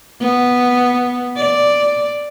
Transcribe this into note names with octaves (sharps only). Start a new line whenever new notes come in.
B3
D5